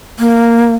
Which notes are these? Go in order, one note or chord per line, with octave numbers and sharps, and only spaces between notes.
A#3